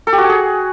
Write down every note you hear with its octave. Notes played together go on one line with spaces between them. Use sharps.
A4
G4
F#4
G#5
G#4